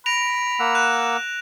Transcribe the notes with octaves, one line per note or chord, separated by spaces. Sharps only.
B5 A#6 D7 F7
A#3 F#5 E6
F#6 E7